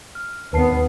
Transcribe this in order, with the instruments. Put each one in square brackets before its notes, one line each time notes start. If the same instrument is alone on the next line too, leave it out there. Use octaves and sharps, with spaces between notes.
[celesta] F6
[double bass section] D#2 B3 [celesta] B4 A5 C7